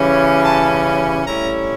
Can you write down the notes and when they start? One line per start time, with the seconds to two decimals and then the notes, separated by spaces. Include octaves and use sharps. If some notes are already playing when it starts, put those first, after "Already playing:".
Already playing: C#3 E3 G3 C#4
0.42 A5
1.25 A2 G3 C#4 E4 A#5